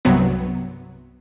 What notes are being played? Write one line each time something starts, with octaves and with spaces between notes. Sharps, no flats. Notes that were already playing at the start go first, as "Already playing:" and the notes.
C2 G2 C3 F#3 B3 C4